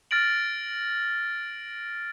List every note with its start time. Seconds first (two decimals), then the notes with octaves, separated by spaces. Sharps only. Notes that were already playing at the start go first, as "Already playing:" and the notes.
0.11 F6 A6 A#6 D7 F#7